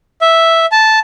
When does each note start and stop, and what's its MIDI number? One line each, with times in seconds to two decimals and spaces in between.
0.21 0.66 76
0.72 0.99 81